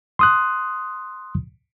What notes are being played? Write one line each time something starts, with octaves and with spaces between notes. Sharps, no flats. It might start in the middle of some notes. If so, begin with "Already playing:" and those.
C6 D#6 F#6